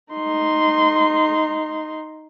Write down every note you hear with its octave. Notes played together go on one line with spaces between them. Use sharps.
D#4 C6